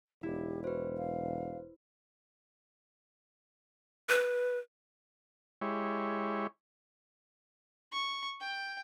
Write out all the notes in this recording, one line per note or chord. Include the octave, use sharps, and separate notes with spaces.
E1 E4 G4
F#4 B4 C5
F5
B4
G#3 E4 G4 C#5
C#6
G5